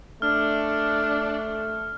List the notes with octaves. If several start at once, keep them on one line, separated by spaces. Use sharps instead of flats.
A3 D4 F6